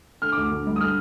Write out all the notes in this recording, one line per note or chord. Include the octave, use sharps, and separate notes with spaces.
D3 F6
D2 D6
D3
G2
D#6
D3 F6